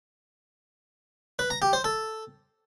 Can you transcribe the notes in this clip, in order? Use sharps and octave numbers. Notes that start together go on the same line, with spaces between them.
B4
A#5
G4
C5
A4